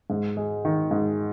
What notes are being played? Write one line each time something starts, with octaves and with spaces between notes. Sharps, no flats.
G#2
G#3
D#3
G#2